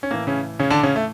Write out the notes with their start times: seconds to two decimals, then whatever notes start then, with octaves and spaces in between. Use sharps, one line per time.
0.03 C#4
0.11 A2 E3 A#3
0.27 C#3 C#4
0.59 C#3 C#4
0.70 D3 D4
0.83 C#3 C#4
0.96 A3